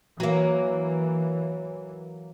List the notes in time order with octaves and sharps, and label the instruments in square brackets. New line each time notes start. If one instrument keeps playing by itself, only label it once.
[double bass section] E3 [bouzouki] F#3 A#3